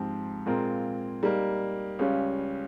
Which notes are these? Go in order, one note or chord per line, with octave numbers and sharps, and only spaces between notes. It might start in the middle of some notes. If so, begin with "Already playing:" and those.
Already playing: G#2 F3 C4 G4
A#2 G#3 C4 F4 A#4
G3 A#3 D#4
C#2 C#3 G3 C#4